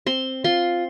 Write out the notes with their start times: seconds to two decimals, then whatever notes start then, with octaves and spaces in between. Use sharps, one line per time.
0.06 C4 C6
0.44 F4 C6